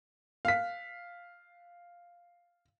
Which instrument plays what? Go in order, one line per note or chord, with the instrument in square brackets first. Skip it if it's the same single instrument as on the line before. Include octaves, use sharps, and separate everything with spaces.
[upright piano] F5 B6